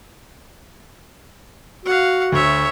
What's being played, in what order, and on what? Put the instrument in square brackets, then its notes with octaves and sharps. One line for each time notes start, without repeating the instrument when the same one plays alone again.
[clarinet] F#4 [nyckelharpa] F5 F#5
[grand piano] D2 [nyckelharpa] C#5 E5